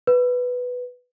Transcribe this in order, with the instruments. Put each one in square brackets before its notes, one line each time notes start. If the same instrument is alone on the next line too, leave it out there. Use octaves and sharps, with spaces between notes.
[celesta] B4